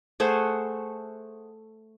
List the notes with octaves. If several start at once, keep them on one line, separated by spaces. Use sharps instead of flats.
A3 G#4 C5 F#5